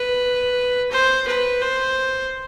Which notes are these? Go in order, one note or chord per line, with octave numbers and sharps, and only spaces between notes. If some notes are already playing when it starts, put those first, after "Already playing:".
Already playing: B4
C5
B4
C5